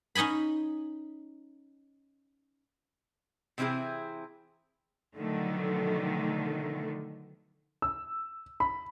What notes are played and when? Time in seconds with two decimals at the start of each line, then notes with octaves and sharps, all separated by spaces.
0.15 C#4 D#4 D#5 G#5 B5
3.58 C3 E3 C4 E4 G#4
5.15 B2 D3 D#3 F3 F#3 A3
7.82 E6
8.60 B5